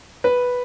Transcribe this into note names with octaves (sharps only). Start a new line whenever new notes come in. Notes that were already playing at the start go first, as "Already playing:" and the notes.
B4